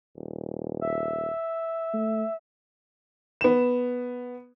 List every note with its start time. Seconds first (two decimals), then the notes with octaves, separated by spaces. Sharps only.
0.16 D#1
0.81 E5
1.93 A3
3.41 B3 E7